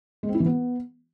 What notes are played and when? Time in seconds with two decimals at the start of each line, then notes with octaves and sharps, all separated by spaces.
0.23 G#3
0.29 C4
0.34 E4
0.40 E3
0.46 B3